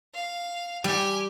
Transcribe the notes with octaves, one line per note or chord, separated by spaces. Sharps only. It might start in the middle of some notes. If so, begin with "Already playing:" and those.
F5
G3 G4 G#5